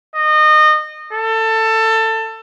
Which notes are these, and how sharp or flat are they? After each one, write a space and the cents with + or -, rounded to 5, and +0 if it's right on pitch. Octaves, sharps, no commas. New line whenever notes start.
D#5 -25
A4 +20